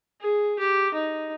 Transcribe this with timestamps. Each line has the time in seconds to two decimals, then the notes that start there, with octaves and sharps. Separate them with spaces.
0.21 G#4
0.59 G4
0.94 D#4